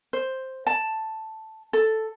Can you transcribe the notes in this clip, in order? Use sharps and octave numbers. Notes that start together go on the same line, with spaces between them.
C5
A5
A4